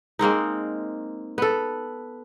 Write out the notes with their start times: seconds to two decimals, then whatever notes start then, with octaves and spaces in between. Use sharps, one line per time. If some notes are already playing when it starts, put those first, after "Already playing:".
0.19 G#3 A#3 C4 D#4
1.38 B3 A4